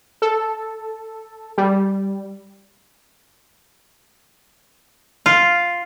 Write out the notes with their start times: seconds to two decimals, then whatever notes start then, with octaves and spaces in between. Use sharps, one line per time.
0.22 A4
1.58 G3
5.26 F4